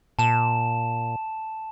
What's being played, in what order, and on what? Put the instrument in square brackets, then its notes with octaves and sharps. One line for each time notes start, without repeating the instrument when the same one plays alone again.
[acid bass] A#2 [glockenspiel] A5 E7